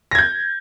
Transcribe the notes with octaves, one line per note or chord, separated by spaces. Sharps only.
G6 G#6 A#6